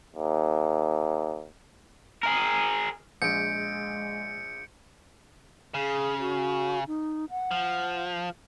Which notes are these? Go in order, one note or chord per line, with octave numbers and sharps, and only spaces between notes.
D#2
G#4 A#4
A#1 G#3 G6 C#7 D7
C#3 G#4
F#4
D#4
F#5
F3